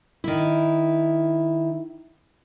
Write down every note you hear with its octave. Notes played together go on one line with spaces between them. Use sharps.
D#3 E4